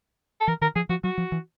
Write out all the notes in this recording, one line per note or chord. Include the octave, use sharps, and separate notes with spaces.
A4
E3 A#4
D#3 A#4
F3 G#4
F3 F#4
F#3 F#4
F3
E3